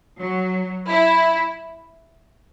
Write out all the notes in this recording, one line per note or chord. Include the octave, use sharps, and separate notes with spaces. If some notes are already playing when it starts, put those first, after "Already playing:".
F#3
E4